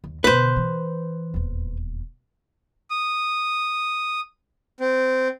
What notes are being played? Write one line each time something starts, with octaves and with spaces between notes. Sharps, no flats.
D#2
B2 D3 B4 C5
E3
D#1 E2
D#6
C4